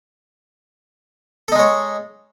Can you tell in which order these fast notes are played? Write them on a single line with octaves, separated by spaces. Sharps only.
A4 D#4 G#3 C#5